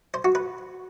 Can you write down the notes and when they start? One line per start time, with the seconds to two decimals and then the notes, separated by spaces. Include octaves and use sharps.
0.14 C5
0.25 F#4
0.35 B4